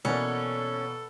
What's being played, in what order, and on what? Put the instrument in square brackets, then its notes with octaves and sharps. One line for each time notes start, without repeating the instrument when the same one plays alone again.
[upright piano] B2 E3 A#3 [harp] B3 D5 [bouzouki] C#4 [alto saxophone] A4